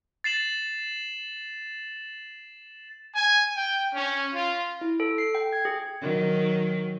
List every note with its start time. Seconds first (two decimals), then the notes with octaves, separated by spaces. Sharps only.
0.24 A6 C7 E7 F#7
3.15 G#5
3.56 G5
3.95 C#4
4.35 F4
4.81 E4
5.00 A4
5.18 C7
5.35 G5
5.53 G#6
5.65 G#4
6.02 D#3 F#3